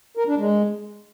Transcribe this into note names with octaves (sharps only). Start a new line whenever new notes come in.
A#4
D4
G#3